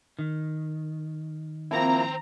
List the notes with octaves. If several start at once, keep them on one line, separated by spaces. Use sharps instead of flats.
D#3
F3 A#3 C4 E4 A#5